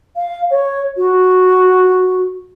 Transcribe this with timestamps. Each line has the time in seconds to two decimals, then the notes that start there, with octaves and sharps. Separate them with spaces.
0.16 F5
0.51 C#5
0.97 F#4